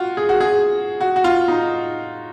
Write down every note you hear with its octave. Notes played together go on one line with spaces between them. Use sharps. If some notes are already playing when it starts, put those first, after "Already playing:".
Already playing: F4 F#4
G#4
F#4
G#4
F#4
F#4
F4
D#4